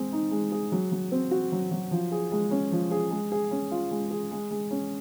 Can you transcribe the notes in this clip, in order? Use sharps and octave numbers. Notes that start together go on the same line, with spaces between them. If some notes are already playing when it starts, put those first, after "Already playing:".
Already playing: G#3 C4 G#4
D#4
G#3
G#4
F#3
F#3
C4
F#4
F#3
F#3
F3
G#4
G#3
C#4
F3
G#4
G#3
G#4
C#4
F4
G#3
G#4
G#3
G#3
C#4